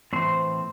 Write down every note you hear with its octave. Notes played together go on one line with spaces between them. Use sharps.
A2 E3 C4 C5